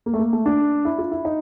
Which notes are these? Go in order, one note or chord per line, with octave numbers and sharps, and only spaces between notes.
A#3
A3
A#3
A3
D4
E4
F4
E4
D#4